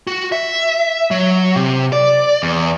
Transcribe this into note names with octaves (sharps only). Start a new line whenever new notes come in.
F#4
E5
F#3
C3
D5
E2